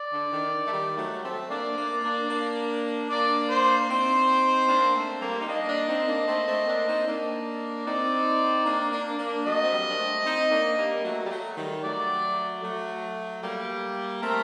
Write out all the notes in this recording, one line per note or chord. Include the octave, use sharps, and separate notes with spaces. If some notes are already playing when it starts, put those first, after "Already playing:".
Already playing: D5
D3
D#3
A3
D#3 G3
F#3 A3
A3 C4
A#3 D4 D5
A#3 D4
A#3 D4
A#3 D4
A#3 D4 D5
C5
C4 D#4 C5
A#3 D4
A3 C4
G3 A#3
D#4
A#3 D4 D#5
A#3 D4
C4 D#4
A#3 D4
A3 C4
A3 C4
A#3 D4
C4 D#4
A#3 D4
C4 D#4 D5
A#3 D4
A#3 D4
A#3 D4
F#3 A3 D#5
C4
G3 A#3
D4
A3 C4
C4 D#4
A#3 D4
G3 A#3
F#3 A3
G3
F#3 A3
D#3 G3
F#3 A3 D5
F#3 A3
G3 A#3
A3 C4 A#4